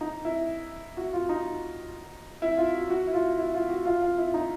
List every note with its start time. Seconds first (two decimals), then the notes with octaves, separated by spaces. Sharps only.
0.01 D#4
0.25 E4
0.97 F#4
1.13 F4
1.29 D#4
2.42 E4
2.57 F4
2.74 F#4
2.90 F#4
3.07 E4
3.14 F4
3.38 E4
3.54 F4
3.69 F#4
3.85 F4
4.02 F4
4.18 E4
4.34 D#4